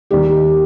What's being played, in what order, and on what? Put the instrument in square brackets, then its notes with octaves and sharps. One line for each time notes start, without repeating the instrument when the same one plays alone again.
[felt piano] D#2 D#3 G3 G4